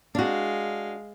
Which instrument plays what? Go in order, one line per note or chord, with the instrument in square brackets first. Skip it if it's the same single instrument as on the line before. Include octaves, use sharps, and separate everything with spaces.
[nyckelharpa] G#3 F5 [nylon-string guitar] D4 F#4